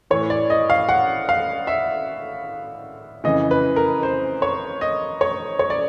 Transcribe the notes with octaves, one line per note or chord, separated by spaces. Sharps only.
A2 E3 C#5
D5
D#5
F5
F#5
F5
E5
F2 C#3 E3 D#5
B4
A#4
C5
C#5
D#5
C#5
C#5
D5